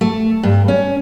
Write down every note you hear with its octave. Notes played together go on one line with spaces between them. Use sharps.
A3
G2
C#4